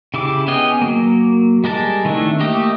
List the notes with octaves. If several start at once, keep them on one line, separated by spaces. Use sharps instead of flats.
C#3 E4 G4 D6
B3 C#4 G#4 D#5 G5
F#3 A#3
G3 G#3 A#4 A5
D#3 A3 C4 D4 E4
A3 A#3 G4 D#5